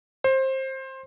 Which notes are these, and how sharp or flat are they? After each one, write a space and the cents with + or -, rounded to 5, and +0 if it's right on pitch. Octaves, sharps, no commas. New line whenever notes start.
C5 +20